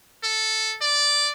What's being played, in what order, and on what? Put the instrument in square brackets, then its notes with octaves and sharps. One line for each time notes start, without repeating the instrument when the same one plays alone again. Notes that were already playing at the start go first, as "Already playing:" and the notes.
[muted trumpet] A4
D5